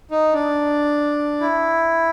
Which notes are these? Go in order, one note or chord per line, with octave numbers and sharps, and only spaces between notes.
D#4
D4
E4